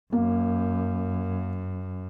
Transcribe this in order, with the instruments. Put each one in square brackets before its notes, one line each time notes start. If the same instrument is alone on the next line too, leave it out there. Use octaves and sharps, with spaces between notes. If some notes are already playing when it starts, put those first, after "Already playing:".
[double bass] F#2 [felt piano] A#3